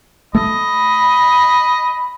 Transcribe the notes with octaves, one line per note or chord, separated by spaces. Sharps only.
A3 D#5 B5